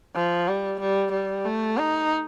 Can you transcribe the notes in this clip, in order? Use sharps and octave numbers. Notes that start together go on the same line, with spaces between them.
F3
G3
G3
G3
A3
D#4